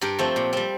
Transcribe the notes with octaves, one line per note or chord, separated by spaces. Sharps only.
G2 G4 A#4
F3 A3 C4
A#2
G3 C4